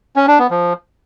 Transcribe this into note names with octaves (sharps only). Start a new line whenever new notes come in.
C#4
D4
B3
F3